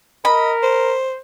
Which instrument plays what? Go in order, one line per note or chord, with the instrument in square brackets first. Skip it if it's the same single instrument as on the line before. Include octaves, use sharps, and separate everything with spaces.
[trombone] A#4 [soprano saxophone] D#5 [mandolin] B5
[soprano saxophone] C5